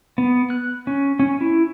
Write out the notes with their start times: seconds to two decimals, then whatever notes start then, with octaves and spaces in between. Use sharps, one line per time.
0.18 B3
0.50 F#6
0.87 C#4
1.19 C#4
1.41 E4